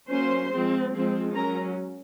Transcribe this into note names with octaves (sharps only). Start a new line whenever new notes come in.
F#3 A#3 C#4 C5 C6
F3 G#3 C4
F3 G#3 C4
F#3 C#4 A#4 A#5